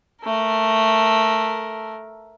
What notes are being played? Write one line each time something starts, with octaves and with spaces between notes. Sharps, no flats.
A3 A#4